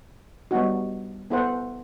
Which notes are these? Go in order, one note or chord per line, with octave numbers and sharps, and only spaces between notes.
G3 B3 D#4 F#4
B3 E4 A4 C5 F#5